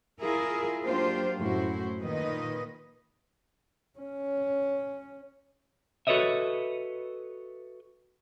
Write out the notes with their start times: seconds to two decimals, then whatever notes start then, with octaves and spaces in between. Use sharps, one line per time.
0.20 E4 F4 G#4 A#4 E5
0.84 F#3 A#3 D4 F4 G4 C5
1.38 F#2 A2 E4 F#4 C5
2.02 A#2 D#3 B4 D#5
3.99 C#4
6.07 F#4 A4 B4 C#5 D#5 E5